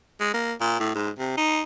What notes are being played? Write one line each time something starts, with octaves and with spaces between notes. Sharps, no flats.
G#3
A#3
A#2
A2
G#2
C3
D#4